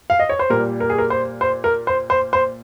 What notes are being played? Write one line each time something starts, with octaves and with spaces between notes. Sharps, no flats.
F5
D#5
C#5
C5
A#2 G3 A#4
A#4
G#4
A#4
C5
C5
A#4
C5
C5
C5